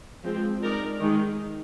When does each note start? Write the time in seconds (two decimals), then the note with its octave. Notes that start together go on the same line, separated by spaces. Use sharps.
0.23 F3 G#3 C4
0.62 G#3 D#4 A#4 D5
1.00 D#3 G#3 D#4 G#4